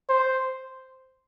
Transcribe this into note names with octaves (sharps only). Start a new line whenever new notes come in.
C5